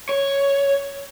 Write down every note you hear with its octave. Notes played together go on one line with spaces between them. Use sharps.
C#5